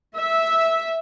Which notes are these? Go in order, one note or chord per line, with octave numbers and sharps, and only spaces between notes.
E5